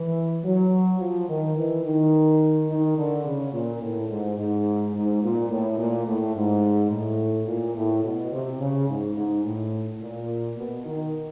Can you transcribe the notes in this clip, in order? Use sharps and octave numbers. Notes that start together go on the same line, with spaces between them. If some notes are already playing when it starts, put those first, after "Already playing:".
Already playing: E3
F#3
F3
D#3
E3
D#3
D#3
D3
C#3
A#2
A2
G#2
G#2
G#2
A#2
A2
A#2
A2
G#2
A2
A#2
A2
B2
C3
C#3
G#2
G#2
A2
A#2
B2
D#3